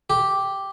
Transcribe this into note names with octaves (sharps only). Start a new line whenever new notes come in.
G4